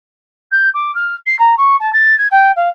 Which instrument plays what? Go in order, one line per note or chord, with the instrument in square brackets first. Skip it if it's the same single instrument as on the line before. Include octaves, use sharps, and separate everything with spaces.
[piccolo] G6
D6
F6
C7
A#5
C#6
A5
A6
G#6
G5
F5